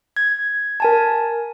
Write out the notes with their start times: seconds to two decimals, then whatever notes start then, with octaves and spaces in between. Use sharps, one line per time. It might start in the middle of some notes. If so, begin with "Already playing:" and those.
0.17 G#6
0.80 A#4 G#5 A5